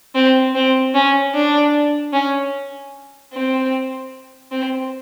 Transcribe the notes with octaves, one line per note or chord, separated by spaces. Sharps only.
C4
C4
C#4
D4
C#4
C4
C4